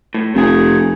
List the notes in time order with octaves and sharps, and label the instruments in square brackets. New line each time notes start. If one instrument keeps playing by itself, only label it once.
[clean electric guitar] A2
[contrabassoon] F1 [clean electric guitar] C3 G#4